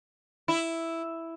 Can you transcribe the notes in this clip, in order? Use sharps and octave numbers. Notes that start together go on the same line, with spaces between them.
E4